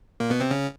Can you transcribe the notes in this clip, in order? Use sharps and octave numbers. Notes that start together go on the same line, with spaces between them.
A#2 A#3
B2 B3
C3 C4
C#3 C#4